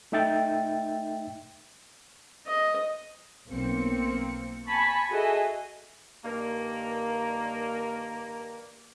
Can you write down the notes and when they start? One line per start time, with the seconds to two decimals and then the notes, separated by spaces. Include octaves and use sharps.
0.12 A3 D#4 E5 G5 A6
2.48 D#5
3.48 B1 A#3 C4 C#7
4.68 G#5 A5 B5 C#6 B6
5.10 F#4 G#4 A4 D#5 E5
6.25 G2 D#3 G3 A#3